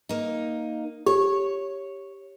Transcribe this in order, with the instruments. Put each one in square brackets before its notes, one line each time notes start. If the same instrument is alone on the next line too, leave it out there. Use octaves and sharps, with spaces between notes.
[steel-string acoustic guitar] A#3 D#4
[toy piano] G4 [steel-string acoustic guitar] C#5